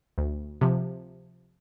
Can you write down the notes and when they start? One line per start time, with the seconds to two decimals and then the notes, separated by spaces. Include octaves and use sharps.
0.18 D2
0.61 C3 F3